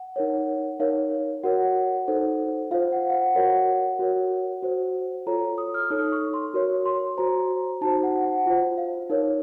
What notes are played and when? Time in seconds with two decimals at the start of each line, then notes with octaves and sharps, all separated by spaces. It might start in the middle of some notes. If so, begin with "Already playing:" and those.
Already playing: F#5
0.16 D#4 A#4 C#5
0.80 D#4 A#4 C#5 F5
1.44 F#4 A#4 C#5 F#5
2.08 D#4 A4 C5
2.71 F4 C5 F5
2.92 F#5
3.10 F5
3.14 F#5
3.34 F#4 A#4 C#5 F#5
3.99 F#4 A#4 C#5
4.63 F#4 C5
5.27 F4 A4 C#5 A#5
5.58 D#6
5.74 F6
5.90 D#4 A4 C#5 D#6
6.12 C#6
6.34 C6
6.54 F#4 A#4 C#5
6.86 C6
7.18 F#4 C5 A#5
7.81 D#4 F#4 C5 A5
8.03 F#5
8.25 F#5
8.46 F4 C5
8.78 F5
9.10 D#4 A#4 C#5